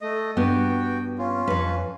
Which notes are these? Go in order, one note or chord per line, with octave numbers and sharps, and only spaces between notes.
A3 D#5
G2 B3 F#4 G5
C#4 F4
F2 B4